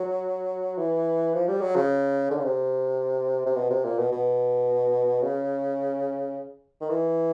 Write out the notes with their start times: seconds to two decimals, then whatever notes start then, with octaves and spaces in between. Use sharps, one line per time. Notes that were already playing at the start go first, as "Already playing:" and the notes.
Already playing: F#3
0.78 E3
1.34 F3
1.48 G3
1.61 F#3
1.76 C#3
2.31 D3
2.38 C#3
2.45 C3
3.46 C3
3.56 B2
3.70 C3
3.85 A#2
3.99 B2
4.12 B2
5.23 C#3
6.81 D#3
6.90 E3